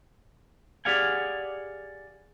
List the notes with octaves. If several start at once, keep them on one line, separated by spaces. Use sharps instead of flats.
G4 G#4 D5 F5 F#5 G#5